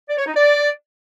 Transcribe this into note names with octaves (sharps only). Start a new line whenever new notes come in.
D5
C#5
D#4
D5